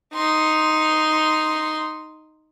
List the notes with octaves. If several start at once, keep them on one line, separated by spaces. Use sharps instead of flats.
D#4 C6